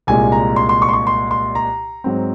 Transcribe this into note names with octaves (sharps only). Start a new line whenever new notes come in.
C2 A#2 G#3 G#5
A#5
C6
C6
C#6
C6
C#6
C6
C6
A#5
G#2 F#3 C4